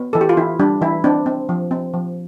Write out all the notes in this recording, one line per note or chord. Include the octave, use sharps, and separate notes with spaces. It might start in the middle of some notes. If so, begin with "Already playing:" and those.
Already playing: B3
E3 A4
G4
F4
E3 E4
G3 D4
E3 E4
C4 D4
C4
F3
C4
F3